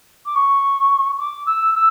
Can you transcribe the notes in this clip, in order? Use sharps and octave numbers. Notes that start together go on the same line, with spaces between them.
D6
C#6
D6
E6
E6